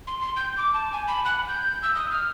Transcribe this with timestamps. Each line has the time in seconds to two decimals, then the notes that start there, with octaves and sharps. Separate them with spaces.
0.07 C6
0.21 C6
0.37 G6
0.57 D6
0.74 A5
0.93 G#5
1.08 B5
1.25 F#6
1.48 G6
1.83 E6
1.95 D#6
2.11 F6